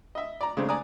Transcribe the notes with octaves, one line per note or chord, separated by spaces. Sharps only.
D#5 E5
D5 A#5
C#3 G#3 A3 C4 D4
D5 G#5 A#5 D6 D#6